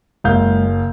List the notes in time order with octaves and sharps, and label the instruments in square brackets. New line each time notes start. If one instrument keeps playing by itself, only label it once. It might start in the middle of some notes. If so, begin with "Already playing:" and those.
[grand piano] F#1 F5 G6 [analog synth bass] G#3